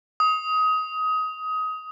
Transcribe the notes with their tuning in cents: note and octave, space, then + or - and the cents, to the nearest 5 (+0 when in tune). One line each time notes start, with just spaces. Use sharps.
D#6 +20